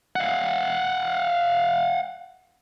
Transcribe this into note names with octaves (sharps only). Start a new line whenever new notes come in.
F5 F#5